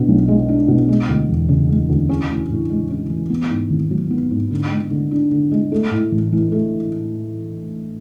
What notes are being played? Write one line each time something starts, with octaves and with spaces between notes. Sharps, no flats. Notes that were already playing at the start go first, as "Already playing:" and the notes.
Already playing: B2 D4
B1
G#3
D4
B2
G#3
D2
E1
C#3
G#3
D2
C#4
E3
A2
G#3
C#4
E3
B3
G#2
G#1
F#3
B3
G#2
D3
G#3
D3
D4
D3
G#3
A3
A2
A1
E3
A3